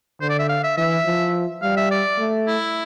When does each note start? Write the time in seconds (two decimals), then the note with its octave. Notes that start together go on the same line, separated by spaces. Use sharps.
0.21 D3 C5
0.30 D5
0.39 E5
0.49 F5
0.64 E5
0.77 E3 E5
1.06 F3
1.62 G3 F5
1.77 E5
1.91 D5
2.19 A3
2.47 E4